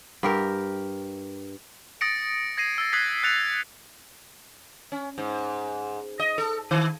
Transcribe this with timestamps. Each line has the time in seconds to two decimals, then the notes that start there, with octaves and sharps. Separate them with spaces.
0.23 G2 G4 A#4
2.01 D#6 A6 A#6 C#7 D7
2.57 G#6 A#6 C7 D#7
2.78 E6 A6
2.93 D#6 F#6 G#6 B6 C7
3.23 F#6 A6 C#7 F7
4.92 C#4
5.18 G#2
6.20 D#5
6.38 A4
6.71 D#3